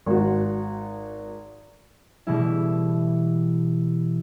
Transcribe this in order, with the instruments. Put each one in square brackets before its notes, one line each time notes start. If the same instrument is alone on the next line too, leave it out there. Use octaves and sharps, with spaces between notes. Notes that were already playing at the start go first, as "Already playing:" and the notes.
[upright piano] G#1 F#4
[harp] B2 E3 G3 A3 E4